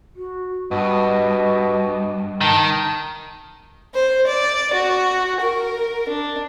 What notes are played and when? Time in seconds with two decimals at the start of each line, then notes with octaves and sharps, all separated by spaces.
0.16 F#4
0.71 G2 B2 D#5
2.41 D#3 A5
3.94 C5
4.27 D5
4.73 F#4
5.41 A#4
6.09 D4